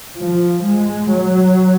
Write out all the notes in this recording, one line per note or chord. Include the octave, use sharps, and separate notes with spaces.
F3
G#3
F#3